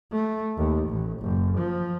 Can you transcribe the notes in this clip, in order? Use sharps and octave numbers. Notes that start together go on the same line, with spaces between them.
A3
D#2
A1
F#1
F3